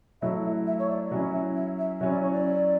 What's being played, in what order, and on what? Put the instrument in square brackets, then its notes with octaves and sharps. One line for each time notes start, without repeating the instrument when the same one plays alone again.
[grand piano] F#3 A3 E4 [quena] E5
[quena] E5
E5
C#5
D5
[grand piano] F#3 C#4 E4 [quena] E5
[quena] E5
E5
E5
[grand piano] F#3 C#4 E4 [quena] E5
[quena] D5
C#5
D5